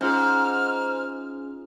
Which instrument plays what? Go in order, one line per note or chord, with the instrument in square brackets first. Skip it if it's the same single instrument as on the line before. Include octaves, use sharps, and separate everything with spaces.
[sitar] G#2 [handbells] C#4 F4 G#4 [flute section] F6